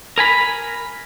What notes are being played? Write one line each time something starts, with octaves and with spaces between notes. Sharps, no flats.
A#4 G#5 B5